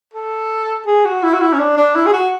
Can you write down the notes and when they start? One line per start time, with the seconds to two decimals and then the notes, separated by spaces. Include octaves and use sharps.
0.14 A4
0.86 G#4
1.05 F#4
1.23 E4
1.34 F#4
1.41 E4
1.53 C#4
1.59 D4
1.77 D4
1.95 E4
2.06 G#4
2.13 F#4